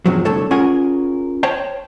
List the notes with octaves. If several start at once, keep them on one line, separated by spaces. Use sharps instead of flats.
E2 G2 C3 F3 F#3
C2 D3 A3 A4 C#5
C#4 F4 G#4 A#4 F#5 G#5
C5 C#5 G5 A5